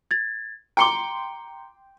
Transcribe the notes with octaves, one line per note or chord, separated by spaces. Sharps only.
G#6 A6
G5 A#5 C6 D6 C#7 G7